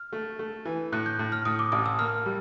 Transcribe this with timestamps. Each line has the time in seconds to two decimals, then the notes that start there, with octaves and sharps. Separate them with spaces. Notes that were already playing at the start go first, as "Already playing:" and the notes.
Already playing: F6
0.13 A3
0.39 A3
0.65 E3
0.92 A2 F#6
1.06 G6
1.19 A2
1.32 F6
1.45 A2 D#6
1.59 D6
1.72 A1 D#6
1.86 E6
1.99 A#3 F6
2.26 G3